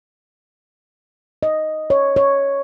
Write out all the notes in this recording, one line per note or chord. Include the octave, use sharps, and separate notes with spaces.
D#5
C#5
C#5